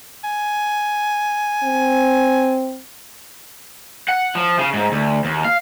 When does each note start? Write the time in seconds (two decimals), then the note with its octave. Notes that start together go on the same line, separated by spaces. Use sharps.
0.24 G#5
1.64 C4
4.09 F#5
4.35 F3
4.59 C#3
4.74 G#2
4.92 D2
5.25 D#2
5.45 F5